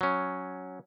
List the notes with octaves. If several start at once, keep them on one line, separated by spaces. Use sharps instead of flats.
F#3 C#4